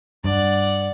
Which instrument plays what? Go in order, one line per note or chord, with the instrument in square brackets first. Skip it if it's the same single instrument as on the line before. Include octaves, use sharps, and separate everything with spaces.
[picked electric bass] G2 [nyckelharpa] D5 F#5